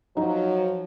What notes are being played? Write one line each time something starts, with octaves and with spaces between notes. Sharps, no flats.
F3 F#3 D#4